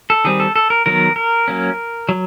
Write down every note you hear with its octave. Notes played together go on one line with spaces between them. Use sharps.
A4
D#3 G3 C4 G#4
A4
A4
A#4
D#3 F#3 B3 A#4
A#4
F#3 A#3 C#4
F#3